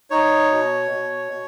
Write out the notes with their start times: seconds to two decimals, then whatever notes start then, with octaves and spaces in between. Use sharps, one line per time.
0.10 D#4 C#5
0.50 B2
0.91 B2
1.32 B2